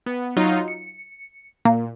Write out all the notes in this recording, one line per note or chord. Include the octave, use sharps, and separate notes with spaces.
B3
F#3 D#4 F4
C#7
A#2 A#3